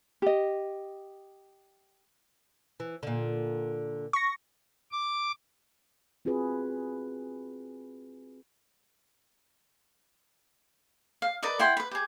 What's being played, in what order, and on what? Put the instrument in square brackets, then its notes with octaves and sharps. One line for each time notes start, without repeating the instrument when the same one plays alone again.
[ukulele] G4 D#5
[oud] E3
A#2 D3
[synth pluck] C#6 A#6
[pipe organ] D6
[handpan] C4 F4 F#4 G#4 B4
[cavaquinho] F5
A#4 B4 D5 D#5
E4 F#5 G5 C6
B4 B5
G4 G#4